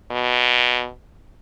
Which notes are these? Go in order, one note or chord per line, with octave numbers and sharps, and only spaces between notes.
B2